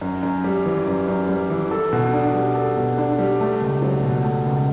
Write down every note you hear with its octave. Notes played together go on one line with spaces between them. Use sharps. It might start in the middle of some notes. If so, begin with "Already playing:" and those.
F#2
F#2
G3
E3
F#2
F#2
G3
E3
A4
B2
D4
G3
A4
B2
D4
G3
A3
C#2
F#3
B2
A3
C#2